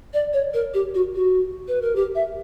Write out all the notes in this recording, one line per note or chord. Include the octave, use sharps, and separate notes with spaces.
D5
C#5
A#4
G4
F#4
F#4
B4
A#4
G4
E5